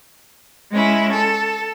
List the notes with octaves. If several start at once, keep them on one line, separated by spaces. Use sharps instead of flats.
G#3 C#4 E4
A4